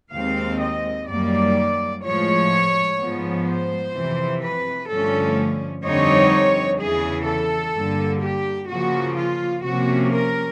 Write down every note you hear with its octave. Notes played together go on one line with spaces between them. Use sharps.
D#2 D#3 G#3 C4 F5
D#5
F#2 D#3 G3 A#3 D5
A2 F3 G#3 C#5
G#2 F3 G#3 B3
C5
F2 C3 E3
B4
G2 D3 F3 A3 C#4 A4
F2 D3 G3 C4 D#4 C#5
E2 C#3 E3 G#4
A4
G2 D3 G3 A#3
G4
C#3 F3 A#3 F#4
F4
C3 F3 A#3 C#4 F#4
A#4